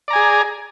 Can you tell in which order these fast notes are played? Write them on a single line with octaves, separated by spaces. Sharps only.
D5 A#5 G#5 G#4